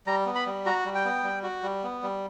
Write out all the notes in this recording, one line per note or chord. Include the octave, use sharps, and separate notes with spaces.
G3 A#5
B3
B5
G3
F#4 A#5
G3
G5
B3
G3
F#4
G3
B3
G3